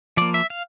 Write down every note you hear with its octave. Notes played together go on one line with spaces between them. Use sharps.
F3 A#3 D5
E5
F5